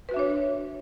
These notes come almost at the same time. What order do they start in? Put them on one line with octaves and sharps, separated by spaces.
B4 F#4 E5 D4 C#5